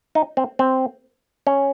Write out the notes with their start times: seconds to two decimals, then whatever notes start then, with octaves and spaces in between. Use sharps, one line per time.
0.15 D#4
0.37 C4
0.59 C4
1.47 C#4